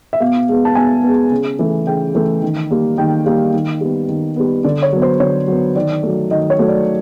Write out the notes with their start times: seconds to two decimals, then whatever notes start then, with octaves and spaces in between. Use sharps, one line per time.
0.13 E5
0.20 B2 F5
0.48 G#3 B3
0.65 A5
0.75 B2 G#5
1.03 G#3 B3
1.31 C#3
1.59 E3 A3
1.87 C#3 G5
2.15 E3 A3
2.42 D#3
2.71 G3 A#3
2.98 D#3 G5
3.26 G3 A#3 F5
3.54 D#3
3.81 G3 B3
4.09 D#3
4.36 G3 B3
4.64 D3 D5
4.83 C#5
4.92 F#3 B3
5.02 C5
5.20 D3 C#5
5.48 F#3 B3
5.75 D#3 D5
6.03 F#3 A3
6.31 D#3 D#5
6.50 C#5
6.59 F#3 A3
6.68 D5